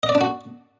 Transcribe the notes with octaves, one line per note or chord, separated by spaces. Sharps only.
D#5
D5
D4
F#4